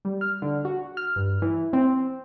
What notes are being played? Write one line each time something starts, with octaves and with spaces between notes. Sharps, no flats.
G3
F6
D3
F#4
F6
G2
E3
C4